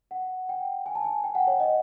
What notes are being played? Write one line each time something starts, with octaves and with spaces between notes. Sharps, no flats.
F#5
G5
G#5
A5
G#5
G5
F#5
C#5
D#5